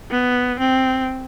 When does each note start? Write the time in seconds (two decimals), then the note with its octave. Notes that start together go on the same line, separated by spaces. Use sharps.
0.11 B3
0.60 C4